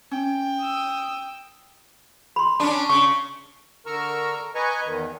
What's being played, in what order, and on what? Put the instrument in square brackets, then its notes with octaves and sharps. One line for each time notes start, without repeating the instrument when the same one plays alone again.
[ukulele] C#4 [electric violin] G5
[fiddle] D#6 E6
[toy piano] B5 C6
[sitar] C#4 D4 [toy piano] A5
[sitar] C#3 [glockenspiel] C#6
[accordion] D3 A#4 A#5 C#6 E6 F6
B4 D#5 G#5 A#5 C#6
E2 D#3